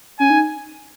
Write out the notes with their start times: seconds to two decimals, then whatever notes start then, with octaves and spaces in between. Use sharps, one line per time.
0.20 C#4 G#5
0.30 D#4